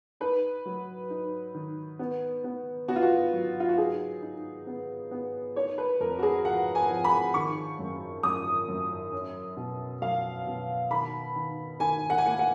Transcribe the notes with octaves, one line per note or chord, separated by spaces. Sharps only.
D#4 B4
F#3
D#4
D#3
B3
B3
B3 F#4
F4
F#4
F#3
F4
F#4
D#4 G#4
D#4
B3
B3
D#4 C#5
B4
F2 A#4
F#4
G#4
F3 F#5
G#5
F3
B5
D#3 C#6
F#2
F#2 D#6
F#2
C#4
B2
F#3 F5
B2
D#3 B5
D#3
D#3 G#5
F#5
G#5
A#3 F#5
F#5